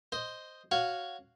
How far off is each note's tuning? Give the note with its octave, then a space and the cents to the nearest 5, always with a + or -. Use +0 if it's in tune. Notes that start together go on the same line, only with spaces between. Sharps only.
C5 +0 D#5 +0
F#4 +0 C#5 +0 F5 +0